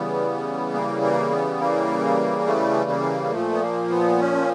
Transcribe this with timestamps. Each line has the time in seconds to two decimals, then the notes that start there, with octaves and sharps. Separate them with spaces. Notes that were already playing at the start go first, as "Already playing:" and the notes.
Already playing: C#3 E3 G3 B3
0.74 A#3
1.03 A#3
1.31 B3
1.60 A#3
2.47 A3
2.90 A#3
3.32 A#2 F3 A3
3.53 B3
3.61 A#3
3.90 B3
4.19 C#4